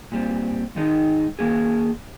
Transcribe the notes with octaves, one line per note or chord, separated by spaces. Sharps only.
A#2 G3 C4
G#2 D#3 G#3 D#4
D#3 A#3 C#4 G#4